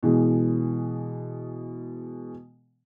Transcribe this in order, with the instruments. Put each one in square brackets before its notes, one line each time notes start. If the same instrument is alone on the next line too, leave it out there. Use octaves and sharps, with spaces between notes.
[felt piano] B2 E3 G#3